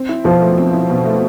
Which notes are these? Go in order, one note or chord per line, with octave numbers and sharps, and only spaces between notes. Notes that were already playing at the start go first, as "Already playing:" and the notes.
Already playing: C4
E4
B2 F3
A3
C4
E4
B2
A3